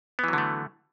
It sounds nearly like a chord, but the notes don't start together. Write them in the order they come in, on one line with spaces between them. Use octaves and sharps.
B3 E3 F#3 D3 A3